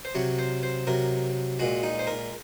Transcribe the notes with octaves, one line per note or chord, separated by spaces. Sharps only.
C5
C3 F#3 C#5
C5
C5
C3 F#3 A#4
A#2 G#3 F#4
D#4
C5
A#4